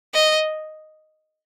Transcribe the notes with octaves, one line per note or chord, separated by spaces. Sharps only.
D#5